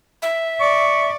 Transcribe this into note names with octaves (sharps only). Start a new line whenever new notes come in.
E5
D5 C#6